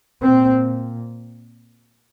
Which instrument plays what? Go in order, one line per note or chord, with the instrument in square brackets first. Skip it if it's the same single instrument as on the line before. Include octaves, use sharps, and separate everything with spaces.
[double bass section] A#2 C4